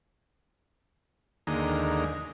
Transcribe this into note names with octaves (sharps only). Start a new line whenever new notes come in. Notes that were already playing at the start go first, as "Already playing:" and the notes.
D#2 D3 G#3 A#3 D#4